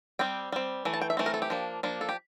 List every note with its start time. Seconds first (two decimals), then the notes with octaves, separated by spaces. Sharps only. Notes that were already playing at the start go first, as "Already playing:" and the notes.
0.19 G3 C4 G5
0.52 G3 C4
0.85 E3 A3
0.93 A5
1.01 G5
1.10 E5
1.17 E3 A3 C4
1.26 A#4
1.34 A4
1.42 G4
1.50 F3 A#3 D4
1.83 F3 A#3 D4
2.01 A4
2.09 G4